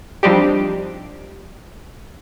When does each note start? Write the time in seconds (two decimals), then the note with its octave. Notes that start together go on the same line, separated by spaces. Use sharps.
0.23 F3 G3 C4 D4 D#4 G4